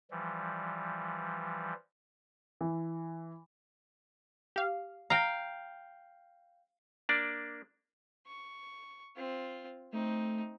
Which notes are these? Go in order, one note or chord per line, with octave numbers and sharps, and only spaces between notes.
E3 F3 G3
E3
G4 F5
F5 G5 A#5
A#3 D4 D5
C#6
C4 F4
A3 C4 D#4